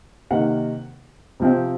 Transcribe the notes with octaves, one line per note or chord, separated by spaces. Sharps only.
C3 D#3 A#3 F#5
C3 F3 C4